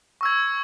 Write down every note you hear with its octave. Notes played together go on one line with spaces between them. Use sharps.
C#6 E6 G#6